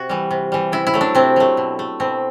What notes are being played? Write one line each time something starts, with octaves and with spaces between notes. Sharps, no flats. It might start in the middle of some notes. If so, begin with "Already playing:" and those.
Already playing: C3 F#4
E3 G3
C3
E3 G3
C3 E4
E4
F#3 A3
D4
C3 C4
F#3 A3
B2
A3
B2 C4